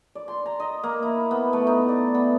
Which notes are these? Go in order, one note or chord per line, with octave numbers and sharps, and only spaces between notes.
D5
C6
A#5
D#5
A#3
E4
B3
A3
D#4
D5
B3